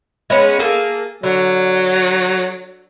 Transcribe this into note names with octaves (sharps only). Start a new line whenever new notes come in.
G#3 B3 C#4
A#3 G#4 A4
D3 F#3